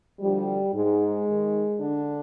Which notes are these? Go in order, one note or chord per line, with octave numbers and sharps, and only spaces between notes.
D2 D3 F3 G3
G#2 G#3
G#2 D#3
D3 D4